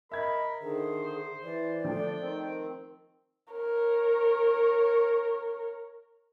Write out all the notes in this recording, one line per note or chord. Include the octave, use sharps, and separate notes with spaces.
A#4 D#5 E5 B5 G#6
D3 D#3 G#4 C5
E3 D5
F3 A3 D4 G5
D#3 C4
A#4 C#5